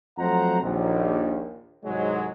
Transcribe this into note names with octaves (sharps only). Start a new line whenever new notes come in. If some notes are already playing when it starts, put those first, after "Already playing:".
F2 F#3 A3 C5 F#5 A#5
A#1 D#2
C2 G#2 F#3 G#3